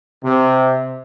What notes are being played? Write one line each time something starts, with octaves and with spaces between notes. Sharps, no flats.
C3